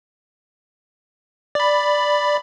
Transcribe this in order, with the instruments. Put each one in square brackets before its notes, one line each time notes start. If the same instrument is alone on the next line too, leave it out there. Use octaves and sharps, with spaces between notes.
[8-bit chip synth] D5 B5